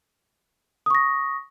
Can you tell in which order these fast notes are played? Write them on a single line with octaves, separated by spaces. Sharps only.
D#6 C#6 A#6